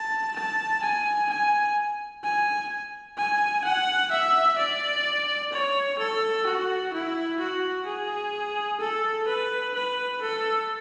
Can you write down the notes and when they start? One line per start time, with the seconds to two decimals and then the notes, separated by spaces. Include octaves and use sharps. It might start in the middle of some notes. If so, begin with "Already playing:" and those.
Already playing: A5
0.36 A5
0.83 G#5
1.30 G#5
2.24 G#5
3.17 G#5
3.64 F#5
4.11 E5
4.58 D5
5.52 C#5
5.99 A4
6.46 F#4
6.93 E4
7.39 F#4
7.87 G#4
8.80 A4
9.28 B4
9.75 B4
10.21 A4